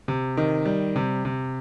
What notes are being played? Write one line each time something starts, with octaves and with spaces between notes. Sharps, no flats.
C3
D#3
G3
C3
C3